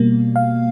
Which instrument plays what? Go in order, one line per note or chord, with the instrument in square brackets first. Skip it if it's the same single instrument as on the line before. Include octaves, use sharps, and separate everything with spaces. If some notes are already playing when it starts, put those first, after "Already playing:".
Already playing: [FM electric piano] B2 G3 A#3
F5